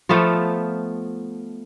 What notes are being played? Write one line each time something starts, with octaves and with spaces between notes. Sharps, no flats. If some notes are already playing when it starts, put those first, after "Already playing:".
F3 A3 B3 F4